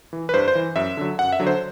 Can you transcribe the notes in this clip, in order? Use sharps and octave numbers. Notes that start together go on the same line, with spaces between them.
E3
B4
G2 C5
C5
E3
F#2 E5
D3 F#3
F#2 F#5
E5
D3 F#3
C5